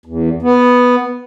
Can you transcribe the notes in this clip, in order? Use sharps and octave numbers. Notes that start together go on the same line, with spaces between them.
E2
B3